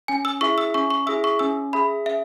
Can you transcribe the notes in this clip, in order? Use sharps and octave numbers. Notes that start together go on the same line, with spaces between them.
C#4 G#5
E6
E4 G#4 E5 C#6
E6
C#4 C#6
C#6
E4 G#4 E5 E6
C#6
C#4 E6
G#4 E5 B5
C#4 E5